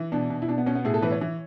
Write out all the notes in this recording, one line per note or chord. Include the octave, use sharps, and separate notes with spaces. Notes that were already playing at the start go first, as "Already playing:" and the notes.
Already playing: E3
B2 D4
B2
E4
B2 D4
B3
B2 C#4
B3
A2 G#4
A4
E3 B4
C#5
E3